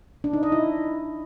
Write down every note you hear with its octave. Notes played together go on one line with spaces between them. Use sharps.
D4
D#4
D#5
E4